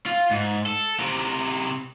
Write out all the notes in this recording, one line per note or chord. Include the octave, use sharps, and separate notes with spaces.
F4
G#2
A4
C3 A#4